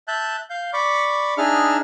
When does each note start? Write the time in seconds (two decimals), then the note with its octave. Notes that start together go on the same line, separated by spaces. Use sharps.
0.08 E5 A5 F#6 G6
0.50 F5 G6
0.73 D5 B5 C#6 D6
1.38 D4 D#4 G#4 E5 F6